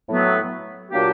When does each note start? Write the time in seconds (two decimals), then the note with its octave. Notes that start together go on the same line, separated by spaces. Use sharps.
0.09 A2 F#3 B3
0.91 A#2 F#3 A#3 D4 G4